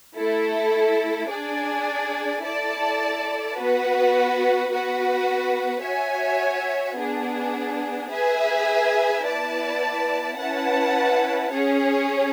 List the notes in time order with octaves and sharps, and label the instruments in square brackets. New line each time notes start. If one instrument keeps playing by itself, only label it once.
[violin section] A3 E4 A4
D4 G#4 D5 G#5
E4 A4 D5 A5
B3 F#4 B4
B3 F#4 B4
F#4 C#5 E5 G#5
B3 D4 G#4
G#4 B4 E5 G#5
B3 E4 B4 D5 A5
C#4 E4 B4 F#5 A5
C#4 G#4 C#5